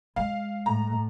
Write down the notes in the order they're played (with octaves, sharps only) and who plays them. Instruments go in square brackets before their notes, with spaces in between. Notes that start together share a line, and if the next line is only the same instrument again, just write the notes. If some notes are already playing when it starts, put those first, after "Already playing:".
[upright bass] G#3 [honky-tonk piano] F5
[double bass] A2 [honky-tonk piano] A#5